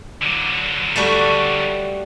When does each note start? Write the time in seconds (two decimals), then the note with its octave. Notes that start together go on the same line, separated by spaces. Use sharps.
0.22 D3 F#3
0.96 G3 A3 F#4